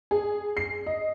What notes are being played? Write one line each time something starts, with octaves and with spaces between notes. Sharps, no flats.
G#4
C7
D#5